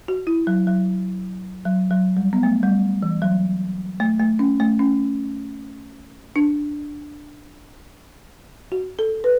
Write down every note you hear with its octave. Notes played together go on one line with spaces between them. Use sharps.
F#4
E4
F#3
F#3
F#3
F#3
G3
B3
A3
G3
E3
F#3
A3
A3
C#4
A3
C#4
D4
F#4
A4
B4